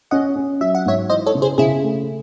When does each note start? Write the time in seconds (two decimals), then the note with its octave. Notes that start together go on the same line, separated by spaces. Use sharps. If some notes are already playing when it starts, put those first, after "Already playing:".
0.11 C#4 D#5 F#5
0.36 C#4
0.61 F#3 E5
0.75 F#5
0.86 G#2 C#5 E5
1.10 E3 C5 D#5
1.26 A4 C#5
1.34 C#3
1.42 G#4 C5
1.58 C#3 E4 G#4
1.82 A3